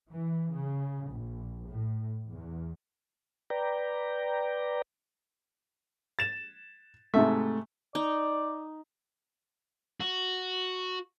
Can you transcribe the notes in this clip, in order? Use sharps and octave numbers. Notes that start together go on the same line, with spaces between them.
E3
C#3
A#1
A2
E2
B4 D5 G5 A#5
A6 E7
G#2 C3 A3 E5
D#4 D5
F#4